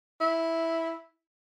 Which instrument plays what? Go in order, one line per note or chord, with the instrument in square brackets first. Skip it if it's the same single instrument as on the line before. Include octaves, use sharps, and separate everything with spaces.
[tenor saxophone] E4